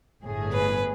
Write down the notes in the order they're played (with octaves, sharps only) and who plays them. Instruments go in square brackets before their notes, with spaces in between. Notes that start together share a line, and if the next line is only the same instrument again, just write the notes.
[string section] G1 A2 G#4
[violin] B4